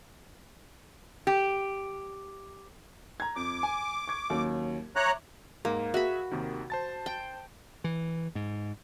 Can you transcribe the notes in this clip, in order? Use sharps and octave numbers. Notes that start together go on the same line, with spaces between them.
G4
A#5 G#6
F2 D6
G#5
C#6 G#6
D#2 F#3 C#4
C#5 E5 A#5 D6 F#6
G#2 A#3
F#4 G#4 E5 B5
D#2 C3 D#3
C5 A5 A6
G5
E3
G#2